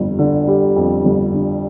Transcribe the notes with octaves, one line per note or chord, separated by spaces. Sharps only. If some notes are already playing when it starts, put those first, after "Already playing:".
Already playing: G1 F2 G3
D3
G3
F2
G1
D3